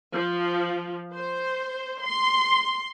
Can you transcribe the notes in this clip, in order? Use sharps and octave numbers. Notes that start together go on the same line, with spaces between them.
F3
C5
C6